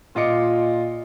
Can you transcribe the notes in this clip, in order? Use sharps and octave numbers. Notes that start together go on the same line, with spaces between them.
A#2 F4 D#5 D6 C#7